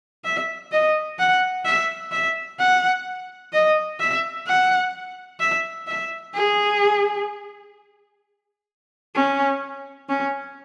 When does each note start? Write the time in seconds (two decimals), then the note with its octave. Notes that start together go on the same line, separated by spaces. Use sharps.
0.25 E5
0.71 D#5
1.19 F#5
1.65 E5
2.12 E5
2.59 F#5
3.53 D#5
4.00 E5
4.47 F#5
5.40 E5
5.87 E5
6.34 G#4
9.15 C#4
10.09 C#4